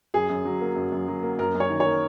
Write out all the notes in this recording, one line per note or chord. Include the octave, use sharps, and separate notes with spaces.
F#2 G#4
F#2
F#3
A#3
F#2
F#2
F#3
A#3
F#2 A#4
F#2
C#5
D#3
C#5
A#3